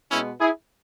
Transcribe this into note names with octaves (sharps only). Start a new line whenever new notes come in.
B2 G#3 B3 C#4 E4
E4 G#4